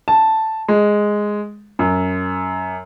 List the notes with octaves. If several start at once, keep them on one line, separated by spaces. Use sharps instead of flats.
A5
G#3
F#2